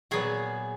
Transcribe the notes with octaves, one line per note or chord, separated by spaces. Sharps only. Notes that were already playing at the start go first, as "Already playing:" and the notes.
A#2 F#3 B3 F#4 G#4